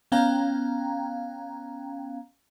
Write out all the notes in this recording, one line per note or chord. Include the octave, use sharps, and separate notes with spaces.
B3 C#4 F5 G5 A#5